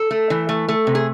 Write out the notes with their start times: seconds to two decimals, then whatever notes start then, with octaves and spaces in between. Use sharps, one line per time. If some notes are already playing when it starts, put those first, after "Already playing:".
Already playing: A4
0.11 A3
0.30 E3
0.49 A3
0.68 A3
0.87 C3
0.95 G#4